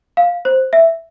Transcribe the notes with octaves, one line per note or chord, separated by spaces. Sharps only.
F5
C5
E5